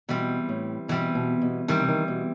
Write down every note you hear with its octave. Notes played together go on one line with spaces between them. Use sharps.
B2 E3 G3 C4
A2
B2 E3 G3 C4
B2
B2
D#3 E3 G3 C4
C3
D#3
B2